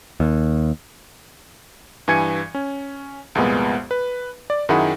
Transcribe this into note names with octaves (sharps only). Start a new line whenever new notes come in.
D#2
G2 E3 G#5 G#6 C#7 D#7
C#4
C2 F2 A#2 G#3 B3
B4
D5
F#2 D#3 E4 G#4 F#5 B5